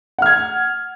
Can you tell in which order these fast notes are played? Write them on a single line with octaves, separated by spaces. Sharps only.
F#5 F6 G#6